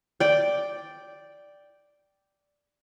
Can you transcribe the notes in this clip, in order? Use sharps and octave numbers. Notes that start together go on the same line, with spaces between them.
D5 G5